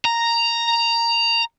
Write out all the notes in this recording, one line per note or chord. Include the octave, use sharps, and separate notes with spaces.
A#5